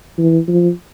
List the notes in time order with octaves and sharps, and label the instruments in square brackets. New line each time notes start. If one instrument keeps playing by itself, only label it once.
[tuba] E3
F3